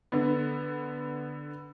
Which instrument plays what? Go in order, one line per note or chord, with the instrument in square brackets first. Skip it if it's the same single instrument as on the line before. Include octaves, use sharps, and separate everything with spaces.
[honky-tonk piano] D3 B3